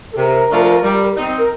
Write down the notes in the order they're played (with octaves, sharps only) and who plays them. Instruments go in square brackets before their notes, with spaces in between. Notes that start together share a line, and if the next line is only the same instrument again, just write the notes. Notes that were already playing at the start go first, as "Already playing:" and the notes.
[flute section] A4
[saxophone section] C3 [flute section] A#4
[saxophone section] F3 A3 D4 F4
G3
C4 D#4
[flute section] A#4